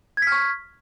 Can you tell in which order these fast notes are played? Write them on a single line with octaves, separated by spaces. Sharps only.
G#6 B6 F6 C#6